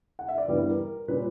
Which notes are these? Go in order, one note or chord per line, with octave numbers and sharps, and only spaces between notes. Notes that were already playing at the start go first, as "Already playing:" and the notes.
F#5
E5
D5
G2 E3 G3 B3 B4
B4
A#4
A#4
A#2 G3 C#4 B4